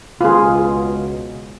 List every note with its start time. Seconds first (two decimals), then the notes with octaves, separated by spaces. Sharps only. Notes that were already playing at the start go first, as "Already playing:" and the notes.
0.21 C#2 B2 F4 G#4